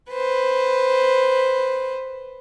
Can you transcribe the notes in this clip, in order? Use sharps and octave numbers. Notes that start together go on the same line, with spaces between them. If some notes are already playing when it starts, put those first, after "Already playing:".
B4 C5